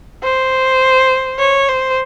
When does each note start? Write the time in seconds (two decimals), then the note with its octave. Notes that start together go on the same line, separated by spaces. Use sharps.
0.23 C5
1.39 C#5
1.69 C5